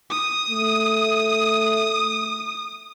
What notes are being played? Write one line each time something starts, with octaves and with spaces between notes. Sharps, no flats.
D#6
A3